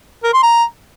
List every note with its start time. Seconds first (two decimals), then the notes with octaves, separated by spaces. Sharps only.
0.24 A#4
0.33 C6
0.43 A#5